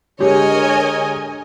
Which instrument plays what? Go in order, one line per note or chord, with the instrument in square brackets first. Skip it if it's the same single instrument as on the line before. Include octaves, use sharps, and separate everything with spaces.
[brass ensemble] D3 A#4 [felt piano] G#3 G4 [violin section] C#5 D#5 G#5